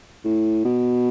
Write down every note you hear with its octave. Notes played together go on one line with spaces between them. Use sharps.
A2
B2